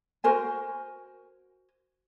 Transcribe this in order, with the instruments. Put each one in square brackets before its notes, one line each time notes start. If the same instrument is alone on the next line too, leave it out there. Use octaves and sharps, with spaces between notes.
[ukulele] F#4 A#4 C5 G#5